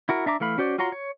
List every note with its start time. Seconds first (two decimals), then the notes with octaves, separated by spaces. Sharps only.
0.09 E4 F#4 A#4
0.26 D4 E5 A#5 D6
0.40 E3 A3 F5 B5
0.58 C#4 F#4 C5 D5
0.78 F4 F#4 C#5 A#5 C6
0.92 C#5